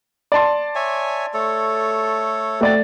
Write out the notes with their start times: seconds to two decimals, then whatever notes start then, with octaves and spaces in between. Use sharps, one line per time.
0.32 D5 A5 C6
0.75 C#5 E5 G#5
1.34 A3 A4 C#5
2.61 A3 C4 F#4 D5 A6